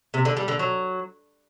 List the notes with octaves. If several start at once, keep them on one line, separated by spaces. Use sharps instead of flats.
C3
D3
G3
D3
F#3